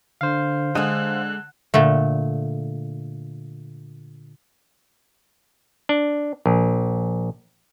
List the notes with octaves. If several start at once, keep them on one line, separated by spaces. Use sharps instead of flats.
D3 C5 F5
D3 G#3 D#5 F#6
A#2 D3 A3
D4
A#1